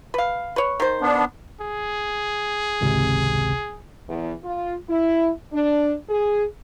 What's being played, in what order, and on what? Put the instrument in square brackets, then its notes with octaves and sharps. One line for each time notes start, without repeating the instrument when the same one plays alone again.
[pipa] B4 F5
B4 C#5
D#3 C5
[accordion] B3 D4
[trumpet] G#4
[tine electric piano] G#1 C#2 C3
[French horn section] E2
F4
E4
D4
G#4